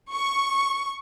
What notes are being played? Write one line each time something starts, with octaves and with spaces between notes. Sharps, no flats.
C#6